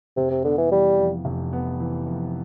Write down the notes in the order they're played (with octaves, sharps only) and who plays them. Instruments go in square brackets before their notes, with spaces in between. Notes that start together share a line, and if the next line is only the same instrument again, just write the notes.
[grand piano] F1 [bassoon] C3
[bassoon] C3
[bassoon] D3 [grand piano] B3
[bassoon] E3
[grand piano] E3 [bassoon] G3
[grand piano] F2
F1
B3
E3
F2